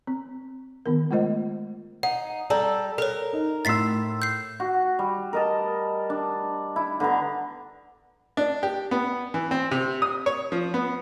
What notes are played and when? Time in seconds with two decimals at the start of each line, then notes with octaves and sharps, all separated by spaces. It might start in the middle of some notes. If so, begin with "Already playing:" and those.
0.07 C4
0.86 D#3 B3 A#4
1.11 G#3 A3 F4 C5 D#5
2.03 D#4 F#5
2.50 G3 A4 A#5
2.98 A4 A#4 C#5
3.33 D#4
3.65 A2 C6 E6 A6 B6 C7
4.22 G6 C7
4.60 F#4
4.99 G3
5.33 A#4 D#5 A5
6.10 D4
6.76 E4
7.00 D3 B3 A#5
8.37 D4
8.63 G4
8.91 B3
9.34 E3
9.51 C4
9.71 C3
10.02 D#6
10.26 C#5
10.52 F3
10.74 B3